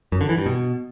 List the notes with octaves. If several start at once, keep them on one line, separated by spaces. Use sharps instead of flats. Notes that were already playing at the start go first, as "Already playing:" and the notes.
F#2
D3
E3
G2
B2